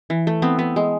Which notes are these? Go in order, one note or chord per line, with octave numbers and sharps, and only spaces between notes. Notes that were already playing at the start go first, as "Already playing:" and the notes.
E3
A3
B3 C4
B3
G#3